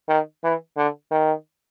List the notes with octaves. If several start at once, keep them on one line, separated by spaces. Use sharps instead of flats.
D#3
E3
D3
D#3